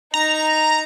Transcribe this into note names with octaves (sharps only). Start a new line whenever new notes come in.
D#4 A#5